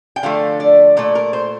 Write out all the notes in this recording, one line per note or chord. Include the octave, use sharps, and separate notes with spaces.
G5
D3 F3 A3 F5
D5
A#2 A3 D5
A#4
C5